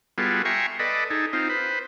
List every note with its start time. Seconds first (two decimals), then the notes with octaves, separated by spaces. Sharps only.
0.18 G3 B3 F4 F#4 G#4 A4
0.45 E5 G5 G#5 A#5 C6 C#6
0.79 A4 B4 D5 D#5
1.10 D#4 G#4 A4
1.33 C4 D#4 F4
1.49 B4 C5